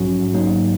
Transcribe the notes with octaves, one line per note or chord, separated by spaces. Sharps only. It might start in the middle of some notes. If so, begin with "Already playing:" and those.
Already playing: A#1 G#2 F#3 C#4 F#4
G#2 F#3 A#3 D#4